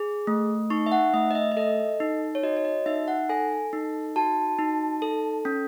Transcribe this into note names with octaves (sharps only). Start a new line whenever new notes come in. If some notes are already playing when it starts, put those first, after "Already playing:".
Already playing: G#4
A3
D#4 C#6
E5
F#5
A3 E5
D#5
E5
E5
A4 D#5
D#4
C#5
F#4 D#5
C#5
D#5
D#4 E5
F#5
A4 G#5
D#4
F#4 A5
D#4
A4
C#4